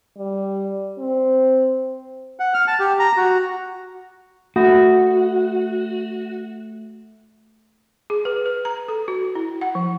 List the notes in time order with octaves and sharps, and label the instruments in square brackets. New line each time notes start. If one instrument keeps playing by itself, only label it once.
[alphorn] G3
C4
[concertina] F#5
F6
A5
G4
A#5
F#4
[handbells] A3 [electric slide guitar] F#4
[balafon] G#4
B4
B4
A#5
A4
F#4
E4
F#5
F3